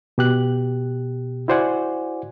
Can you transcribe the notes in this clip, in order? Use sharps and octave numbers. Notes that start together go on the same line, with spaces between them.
B2 G4 F#6
E4 F#4 C5 D5 F#5 G#5